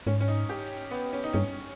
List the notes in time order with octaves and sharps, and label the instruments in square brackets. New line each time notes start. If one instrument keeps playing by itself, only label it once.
[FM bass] G#2 [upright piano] C#4
[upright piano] C#4
D#4
G4
B3
C#4
D#4
[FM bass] G2 [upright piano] C#4